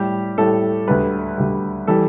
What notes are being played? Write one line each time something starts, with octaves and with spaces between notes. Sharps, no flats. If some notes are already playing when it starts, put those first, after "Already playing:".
Already playing: A2 G3 G4
A2 G3 A4
D2 D3 G3 B4
D2 D3 G3
E3 G3 A4